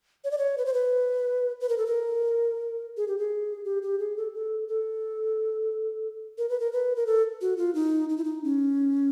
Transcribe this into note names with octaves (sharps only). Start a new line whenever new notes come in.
C#5
D5
C#5
B4
C5
B4
B4
A#4
A4
A#4
G#4
G4
G#4
G4
G4
G#4
A4
A4
A4
A#4
B4
A#4
B4
A#4
A4
F#4
F4
D#4
D#4
E4
D#4
C#4